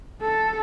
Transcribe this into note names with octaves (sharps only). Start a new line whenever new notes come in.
A4